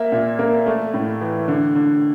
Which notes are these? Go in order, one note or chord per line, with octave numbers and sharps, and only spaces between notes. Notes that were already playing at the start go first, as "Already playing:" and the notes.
Already playing: A#3 E5
A#2
A#3
A3
A2
E3
D3
D3